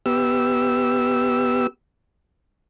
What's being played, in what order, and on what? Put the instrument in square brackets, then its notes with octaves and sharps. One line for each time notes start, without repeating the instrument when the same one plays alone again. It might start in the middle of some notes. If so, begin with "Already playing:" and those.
[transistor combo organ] B3 G4 E6